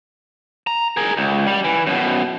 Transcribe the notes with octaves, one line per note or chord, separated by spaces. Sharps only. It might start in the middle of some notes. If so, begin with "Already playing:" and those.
A#5
G#4 A#4
C#2
G3
E3
F#2 B2